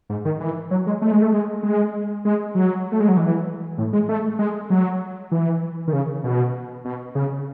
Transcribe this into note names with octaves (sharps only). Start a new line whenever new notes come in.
G#2
D#3
E3
F#3
G#3
A3
G#3
A3
G#3
G#3
G#3
F#3
A3
G#3
F#3
E3
A2
G#3
A3
G#3
F#3
E3
D#3
C#3
B2
B2
C#3